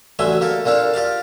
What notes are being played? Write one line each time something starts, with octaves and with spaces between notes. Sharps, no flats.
A1 D3 F#3 E5 G#5 C6
A#3 G4 A4
A#2 A#3 D4 A4 F5
F4 G4 D5 F5